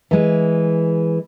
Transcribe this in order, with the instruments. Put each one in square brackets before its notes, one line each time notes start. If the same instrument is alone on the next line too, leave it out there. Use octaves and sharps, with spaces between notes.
[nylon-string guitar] E3 G#3